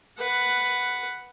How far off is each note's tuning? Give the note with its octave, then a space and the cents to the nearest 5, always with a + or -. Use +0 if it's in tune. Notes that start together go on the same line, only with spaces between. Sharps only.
B4 +5 F#5 +0